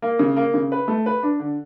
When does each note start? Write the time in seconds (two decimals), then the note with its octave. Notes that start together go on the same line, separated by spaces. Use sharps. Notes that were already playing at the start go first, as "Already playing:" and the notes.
0.02 A#3
0.19 C#3
0.36 A#3
0.54 C#3
0.72 B4
0.88 A3
1.06 B4
1.23 D4
1.40 D3